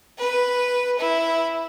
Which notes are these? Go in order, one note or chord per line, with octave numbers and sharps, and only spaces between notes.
B4
E4